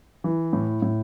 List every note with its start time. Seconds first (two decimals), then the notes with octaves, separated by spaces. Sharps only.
0.24 E3
0.53 A2
0.82 A2